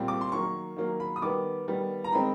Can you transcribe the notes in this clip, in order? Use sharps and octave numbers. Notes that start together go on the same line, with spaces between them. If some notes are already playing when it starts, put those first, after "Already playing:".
Already playing: A#2 G3 C4
D6
C6
D#3 F#3 A#3 C#6
D#3 F#3 A#3
B5
D#6
D#3 G3 B3 D6
D#3 G3 B3
A#5
D#3 G#3 C4 B5